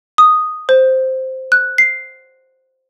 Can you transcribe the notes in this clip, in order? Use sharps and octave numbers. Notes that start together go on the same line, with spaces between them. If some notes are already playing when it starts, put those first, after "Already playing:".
D#6
C5
F#6
C7